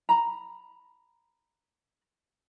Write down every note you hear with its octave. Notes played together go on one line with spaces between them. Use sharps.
A#5 B5